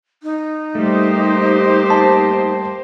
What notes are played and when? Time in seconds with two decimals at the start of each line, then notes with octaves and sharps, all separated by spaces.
0.23 D#4
0.75 G3 A3 A#3 G4 C5
1.90 A5